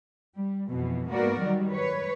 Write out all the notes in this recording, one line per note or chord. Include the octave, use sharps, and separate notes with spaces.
G3
F2 B2 E3
G#2 A#3 B3 F#4 A#4 D5
D#3 F#3 G3
B4 C#5